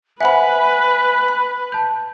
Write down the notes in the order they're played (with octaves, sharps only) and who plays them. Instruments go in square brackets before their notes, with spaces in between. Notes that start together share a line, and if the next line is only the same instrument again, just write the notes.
[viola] B4 [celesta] C5 G#5 [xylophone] E5 F#5 B5 [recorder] F#6
[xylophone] B5
[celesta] A5 G6